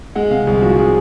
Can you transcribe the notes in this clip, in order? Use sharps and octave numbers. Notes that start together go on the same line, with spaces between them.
G#3 F#5
C3 F5
C2 G#4
F3 F#4
F3 G#4